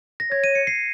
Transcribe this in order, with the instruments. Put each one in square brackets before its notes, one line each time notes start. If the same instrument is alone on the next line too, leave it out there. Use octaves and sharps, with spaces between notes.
[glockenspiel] A#6
[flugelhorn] C#5 [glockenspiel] G#6
[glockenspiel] D#7
C#7
C7